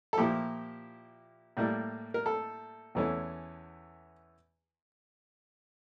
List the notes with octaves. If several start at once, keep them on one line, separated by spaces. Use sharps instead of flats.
A4
A#2 F3 A#3 E4 G4
A2 G3 A#3 E4
A#4
A4
E2 E3 A3 C#4